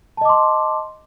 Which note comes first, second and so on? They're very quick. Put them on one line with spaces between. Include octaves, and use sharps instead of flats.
A5 D#5 D6 C6